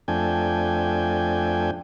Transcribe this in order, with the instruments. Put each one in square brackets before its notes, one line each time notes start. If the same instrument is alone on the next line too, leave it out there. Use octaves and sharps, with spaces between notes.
[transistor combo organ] F2 A3 D4 G5 G#5